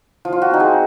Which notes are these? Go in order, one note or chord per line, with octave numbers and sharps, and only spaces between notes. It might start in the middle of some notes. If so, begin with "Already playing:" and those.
F3
F4
F#4
C4 D#4
G#4